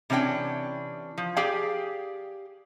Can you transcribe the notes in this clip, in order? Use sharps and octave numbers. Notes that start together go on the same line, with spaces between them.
C3 E3 C#4 D4 G5
F3
G4 G#4 D5 F5 G5